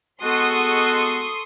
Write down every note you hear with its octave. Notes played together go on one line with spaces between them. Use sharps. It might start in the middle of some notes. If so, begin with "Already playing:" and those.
G#3 B3 F#4 A4 C6 C#6 D#6